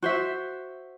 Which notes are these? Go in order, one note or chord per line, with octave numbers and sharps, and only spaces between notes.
F#4 C5 E5